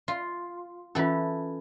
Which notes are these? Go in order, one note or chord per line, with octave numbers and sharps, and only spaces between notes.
F4
E3 C#4 F4 A4